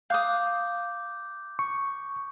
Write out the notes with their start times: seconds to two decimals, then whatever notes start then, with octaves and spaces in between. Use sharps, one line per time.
0.10 F5 D6 D#6 F#6 G6
1.59 C#6